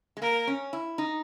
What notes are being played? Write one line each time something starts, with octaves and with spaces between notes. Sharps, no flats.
G#3
A#3 A#4
C#4
E4
D#4